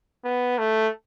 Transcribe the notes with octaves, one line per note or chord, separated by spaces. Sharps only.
B3
A3